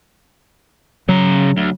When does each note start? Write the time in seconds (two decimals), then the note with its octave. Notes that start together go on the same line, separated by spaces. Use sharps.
1.09 C#3 F#3 A#5
1.57 D2